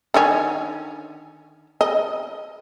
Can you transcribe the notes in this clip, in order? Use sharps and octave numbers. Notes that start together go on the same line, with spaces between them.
D3 D#3 C#4
D#5